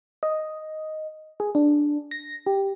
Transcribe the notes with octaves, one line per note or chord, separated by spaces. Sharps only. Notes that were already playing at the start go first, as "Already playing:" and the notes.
D#5
G#4
D4
A#6
G4